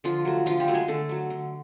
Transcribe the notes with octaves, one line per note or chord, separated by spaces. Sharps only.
D3 F3 F4
F#3 A3
D3 F3 F4
G3 G4
F#3 A3
G#3 G#4
D3 A3 A4
F#3 A3
D3